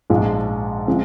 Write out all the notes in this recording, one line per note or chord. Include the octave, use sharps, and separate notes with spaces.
A#1 G#2 F3 G#3
F3 G#3 C4